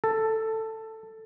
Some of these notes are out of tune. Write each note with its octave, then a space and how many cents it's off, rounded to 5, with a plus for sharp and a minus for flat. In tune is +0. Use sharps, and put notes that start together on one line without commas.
A4 +10